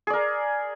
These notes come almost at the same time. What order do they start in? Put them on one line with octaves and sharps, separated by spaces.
G#4 D5 A#4